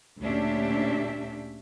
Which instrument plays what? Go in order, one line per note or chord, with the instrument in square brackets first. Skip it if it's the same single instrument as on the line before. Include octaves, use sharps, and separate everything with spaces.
[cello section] D2 A#2 C#4 D4 G4 E5